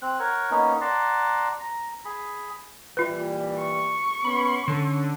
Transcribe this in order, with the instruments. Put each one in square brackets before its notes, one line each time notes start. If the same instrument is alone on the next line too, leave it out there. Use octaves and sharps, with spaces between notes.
[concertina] C4 F#6
A#4 C#5 F#5 C#6
A#3 B3 C#4 D#4
D5 F#5 A5 A#5 C6
A#5
G#4 B5
[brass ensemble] A#2 E3 G3 [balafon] F4 B4
[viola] C#6
[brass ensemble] B3 C#4 [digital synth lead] B5
[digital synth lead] D3 [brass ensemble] C#4 A4